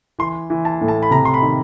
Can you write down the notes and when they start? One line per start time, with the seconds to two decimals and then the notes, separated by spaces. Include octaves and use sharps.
0.19 E3 C6
0.50 E3
0.65 A5
0.81 A2
0.88 A5
1.03 B5
1.11 C3 A#5
1.25 C6
1.34 B5
1.42 D#3